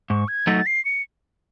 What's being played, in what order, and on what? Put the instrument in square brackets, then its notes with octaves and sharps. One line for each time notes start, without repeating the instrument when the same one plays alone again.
[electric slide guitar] G#2 [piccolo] C#6
[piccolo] G#6
[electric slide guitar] F#3 A3 D#4 F#4 [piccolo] A6
[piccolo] C7
C#7